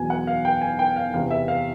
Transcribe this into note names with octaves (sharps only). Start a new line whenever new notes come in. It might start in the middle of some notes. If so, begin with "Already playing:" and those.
Already playing: E2 B2 F#3 G#5
F#5
F5
G5
G#5
G5
F5
E2 C3 E3 F5
E5
F5